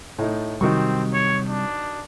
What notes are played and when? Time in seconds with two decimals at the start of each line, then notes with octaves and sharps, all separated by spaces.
0.18 A2 D#4
0.61 C3 D#3 F#3 G3 C4 C#6
1.14 C#5
1.49 D4